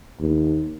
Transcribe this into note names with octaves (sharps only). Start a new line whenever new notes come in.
D#2